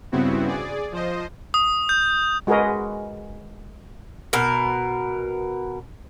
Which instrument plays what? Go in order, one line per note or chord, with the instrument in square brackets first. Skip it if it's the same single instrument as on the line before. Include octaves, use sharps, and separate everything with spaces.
[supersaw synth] G2 C#3 B3 C4 E4 F#4
G#4 D5
F3 C5 D#5
[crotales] D#6
G6
[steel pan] G#3 F#4 G#4 A#4 B4 D#5
[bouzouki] B2 A#4